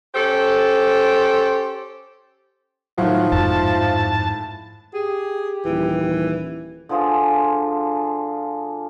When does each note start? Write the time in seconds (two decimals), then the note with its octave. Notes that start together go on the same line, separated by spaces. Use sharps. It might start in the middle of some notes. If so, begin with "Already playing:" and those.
0.14 C#4 G4 A4 C5
2.98 A2 D#3 F3 F#3
3.32 F2 G#2 A5
4.94 G4 G#4
5.65 D#1 E3
6.89 D3 F3 F4 G#4